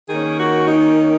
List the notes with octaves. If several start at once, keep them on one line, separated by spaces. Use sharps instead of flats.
D#3 A#3 C#4 G#4
F#4
D#4